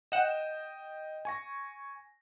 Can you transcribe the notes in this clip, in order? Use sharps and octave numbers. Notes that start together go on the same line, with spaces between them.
D#5 F#5 G5 E7
G#5 C#6 A#6